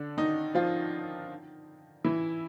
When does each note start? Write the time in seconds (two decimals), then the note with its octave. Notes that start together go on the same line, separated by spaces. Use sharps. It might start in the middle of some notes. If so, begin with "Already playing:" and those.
Already playing: D3 D4
0.17 D#3 D#4
0.55 F3 F4
2.04 E3 E4